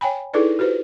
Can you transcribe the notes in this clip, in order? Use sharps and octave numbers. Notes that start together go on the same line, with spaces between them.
C#5 G5 G#5 B5
D#4 E4 G#4 A4 B4 D5
F#4 G4 B4 C5